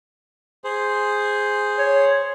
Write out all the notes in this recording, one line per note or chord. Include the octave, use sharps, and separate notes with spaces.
G#4 C5
C#5